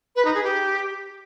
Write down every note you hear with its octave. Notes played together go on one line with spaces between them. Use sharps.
B4
D#4
G#4
G4